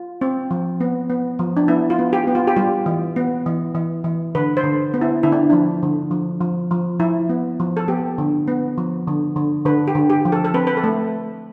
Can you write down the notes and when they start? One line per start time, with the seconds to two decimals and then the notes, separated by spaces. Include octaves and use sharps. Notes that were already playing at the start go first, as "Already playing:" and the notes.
Already playing: F4
0.21 C4
0.51 F3
0.80 B3
1.10 B3
1.39 F3
1.57 D4
1.68 B3 E4
1.90 F4
1.99 B3
2.13 G4
2.27 B3
2.35 F4
2.48 G4
2.57 G3 F4
2.86 E3
3.16 B3
3.46 E3
3.75 E3
4.04 E3
4.35 D3 B4
4.57 C5
4.63 D3
4.94 B3
5.01 E4
5.23 D3 E4
5.32 D4
5.50 F3 D4
5.83 D3
6.11 F3
6.41 F3
6.71 F3
7.00 F3 E4
7.29 B3
7.60 F3
7.77 A4
7.88 B3 G4
8.18 D3
8.48 B3
8.78 F3
9.07 D3
9.36 D3
9.65 D3 B4
9.88 G4
9.95 D3
10.10 G4
10.25 F3
10.32 A4
10.45 A4
10.54 C4 B4
10.67 B4
10.77 A4
10.84 A3